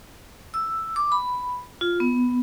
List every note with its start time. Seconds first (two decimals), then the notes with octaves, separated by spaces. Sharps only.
0.54 E6
0.96 D6
1.12 B5
1.81 F4
2.00 B3